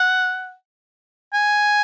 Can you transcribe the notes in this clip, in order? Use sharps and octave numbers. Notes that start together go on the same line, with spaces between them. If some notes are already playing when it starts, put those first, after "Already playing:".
Already playing: F#5
G#5